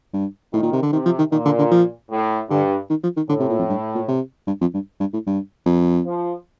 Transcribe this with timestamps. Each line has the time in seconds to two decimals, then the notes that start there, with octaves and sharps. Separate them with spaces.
0.13 G2
0.53 A2 D#3
0.62 A#2
0.72 C3
0.82 D3
0.92 C3 D#3
1.05 F3
1.18 D#3
1.32 A#2 D#3
1.45 D3
1.58 D3
1.71 F3
2.11 A2
2.50 G2 D3
2.90 D#3
3.03 F3
3.16 D#3
3.29 A2 D3
3.39 C3
3.49 A#2
3.58 F2
3.69 G2
3.95 A#2
4.08 C3
4.47 G2
4.61 F2
4.74 G2
5.00 G2
5.13 A2
5.27 G2
5.66 F2
6.05 F3